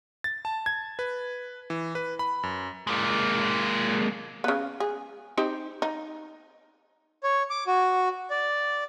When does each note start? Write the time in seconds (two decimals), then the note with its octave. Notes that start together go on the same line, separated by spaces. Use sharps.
0.24 A6
0.45 A5
0.66 G#6
0.99 B4
1.70 E3
1.95 B4
2.19 B5
2.43 F#2
2.87 G#3 A#3
4.44 C#3 B3
4.80 G#4
5.37 C4 D#4 G4
5.82 D#4
7.23 C#5
7.50 D6
7.67 F#4
8.30 D5